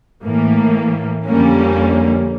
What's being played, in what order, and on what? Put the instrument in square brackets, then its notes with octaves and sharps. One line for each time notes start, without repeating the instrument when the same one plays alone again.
[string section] A2 E3 A#3
F2 D3 G3 A#3 C#4